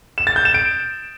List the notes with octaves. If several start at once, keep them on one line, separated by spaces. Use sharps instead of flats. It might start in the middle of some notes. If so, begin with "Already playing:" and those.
E7
A6
G6
E7
D7